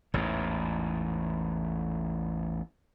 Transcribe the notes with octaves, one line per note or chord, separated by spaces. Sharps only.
A1 E2 G#2